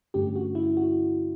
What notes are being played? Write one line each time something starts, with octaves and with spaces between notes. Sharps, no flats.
G2 D3 A3 C#4 G4
F#4
E4
F#4